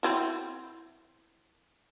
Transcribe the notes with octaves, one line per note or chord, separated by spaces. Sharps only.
C4 E4 F#4